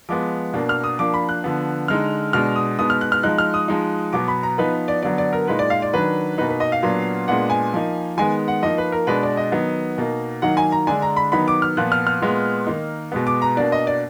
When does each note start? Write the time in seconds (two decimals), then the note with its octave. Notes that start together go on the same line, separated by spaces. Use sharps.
0.09 F3 G#3 B3 D6
0.54 B2 A#3 D4
0.69 F6
0.84 D#6
0.99 F3 A#3 D4 D6
1.14 B5
1.29 F#6
1.44 D3 F3 B3
1.88 D3 G#3 D#4 F6
2.33 B2 G#3 D4 F6
2.56 D#6
2.79 B2 G#3 B3 D#4 D#6
2.90 F6
3.01 F#6
3.12 F6
3.23 F3 G#3 D#4 F#6
3.38 F6
3.54 D#6
3.68 F3 G#3 D#4
4.13 B2 F#3 B3 D6
4.28 B5
4.43 A#5
4.58 F3 B3 D#4 B4
4.88 D5
5.03 D3 F#3 B3 D5
5.18 D5
5.33 A#4
5.48 A#2 G#3 D#4 B4
5.59 D5
5.70 F5
5.82 D5
5.93 D#3 F#3 D4 B4
6.38 B2 A#3 D#4 B4
6.49 B4
6.60 D#5
6.72 F5
6.83 A#2 F#3 B3 D4
7.28 A#2 G#3 B3 D4 F#5
7.50 G#5
7.73 F3 A#3 D#4
8.17 D#3 G#3 B3 G#5
8.48 F#5
8.62 F3 A#3 D#4 D#5
8.78 B4
8.92 A#4
9.07 B2 G#3 D4 B4
9.23 D5
9.37 D#5
9.52 D#3 F#3 B3
9.98 B2 A#3 D#4
10.42 D#3 F#3 A#3 D#4 F#5
10.57 G#5
10.72 A#5
10.87 D3 G#3 D4 G#5
11.02 A#5
11.17 B5
11.32 D#3 F#3 B3 D#4 B5
11.48 D6
11.62 F6
11.77 A#2 F3 B3 F#6
11.92 F6
12.07 F6
12.21 A#2 G#3 B3
12.67 D#3 A#3 D#4
13.12 B2 G#3 B3
13.27 D6
13.42 A#5
13.57 B2 A#3 D4 D5
13.72 D#5
13.87 D5